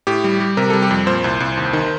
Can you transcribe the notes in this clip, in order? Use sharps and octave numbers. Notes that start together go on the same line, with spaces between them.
A2 G4
G3
G3
C3 A#4
G3 A4
G4
F2
A#2 C5
C2
C2
D#2
D#3